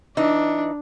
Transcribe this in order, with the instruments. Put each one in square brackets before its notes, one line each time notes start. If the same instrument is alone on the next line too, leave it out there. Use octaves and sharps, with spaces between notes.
[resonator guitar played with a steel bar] E3 D#4 [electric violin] D4